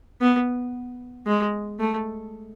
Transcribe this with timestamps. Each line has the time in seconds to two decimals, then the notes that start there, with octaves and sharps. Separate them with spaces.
0.21 B3
1.27 G#3
1.79 A3